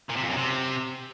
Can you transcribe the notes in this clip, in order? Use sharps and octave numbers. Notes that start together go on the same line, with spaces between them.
A#2
C3
F2
F#2
C3